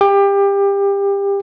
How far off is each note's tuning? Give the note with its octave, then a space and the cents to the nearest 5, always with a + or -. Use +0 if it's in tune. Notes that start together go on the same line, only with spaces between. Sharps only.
G4 +25